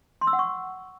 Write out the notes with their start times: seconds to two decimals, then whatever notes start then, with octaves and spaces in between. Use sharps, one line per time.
0.21 C6
0.27 E6
0.33 F#5
0.39 C#6